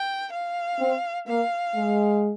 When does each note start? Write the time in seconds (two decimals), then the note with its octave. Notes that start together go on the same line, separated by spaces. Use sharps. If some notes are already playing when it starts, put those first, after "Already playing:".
Already playing: G5
0.32 F5
0.79 C4
1.27 A#3 F5
1.75 G#3